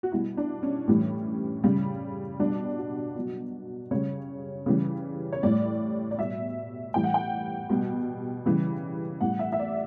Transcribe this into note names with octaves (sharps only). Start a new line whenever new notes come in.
F#4
B2 G3 E4
D4
C#4
A2 E3 G3
C#3 G3
B2 G3 D4
F#4
B2 F#3
C#3 G3 C#5
C#3 E3 G3
C#5
A2 G3 D5
D5
B2 G3 E5
A2 E3 G3 G5
F#5
G5
B2 G3
C#3 E3 G3
A2 G3 F#5
E5
E5
D5